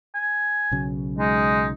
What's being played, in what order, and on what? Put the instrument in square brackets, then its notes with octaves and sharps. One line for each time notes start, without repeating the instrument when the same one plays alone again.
[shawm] G#5
[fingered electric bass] B1 C#3 F#3
[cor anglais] G#3 [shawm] D#4